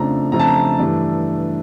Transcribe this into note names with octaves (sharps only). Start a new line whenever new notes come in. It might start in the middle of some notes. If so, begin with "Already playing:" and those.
Already playing: F2 C#3 F3 A3 D4 A#5
F2 C#3 F3 A3 D4 A#5
A5
A#5
G2 E3 A3 D4